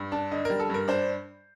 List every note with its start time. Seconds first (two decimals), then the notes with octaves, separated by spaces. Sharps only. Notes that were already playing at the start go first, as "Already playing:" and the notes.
Already playing: G2
0.12 D4 A5
0.31 D3 D#5
0.45 G3 A#4
0.60 A4
0.70 G2 A#4
0.88 D4 C5